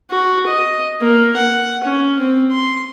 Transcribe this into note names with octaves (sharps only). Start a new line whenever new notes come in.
F#4
D#5
A#3
F#5
C#4
C4
C6